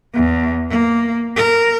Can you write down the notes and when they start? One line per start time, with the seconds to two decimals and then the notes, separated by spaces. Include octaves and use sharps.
0.14 E2
0.70 A#3
1.36 A#4